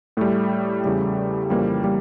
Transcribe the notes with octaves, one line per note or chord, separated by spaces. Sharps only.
A2 G3 A3
E2 C#3 G3
F2 C#3 E3 G3 A#3
G3 A#3